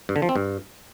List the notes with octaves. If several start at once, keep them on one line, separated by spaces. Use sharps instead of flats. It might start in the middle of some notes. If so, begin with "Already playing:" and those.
G2
D3
F3
C4
G2